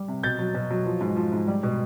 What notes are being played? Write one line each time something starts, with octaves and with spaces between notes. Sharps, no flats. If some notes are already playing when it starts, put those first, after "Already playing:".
Already playing: G3
C3
B2 G6 A6
F#3
B2
F#3
F3
G#2
F3
G#2
G3
B2